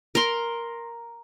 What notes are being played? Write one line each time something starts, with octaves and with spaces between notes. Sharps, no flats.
A#4 C6